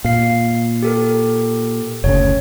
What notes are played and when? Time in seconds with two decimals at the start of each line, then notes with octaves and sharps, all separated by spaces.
0.04 A#2 F5 C7
0.82 G4 A4 A#4
2.04 F#1 D2 C#3 C#5